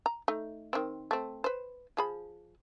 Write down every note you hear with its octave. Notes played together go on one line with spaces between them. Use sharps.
A#5
A3 D#4
D#3 C4
A3 C4
B4 C5
F3 G#4 B5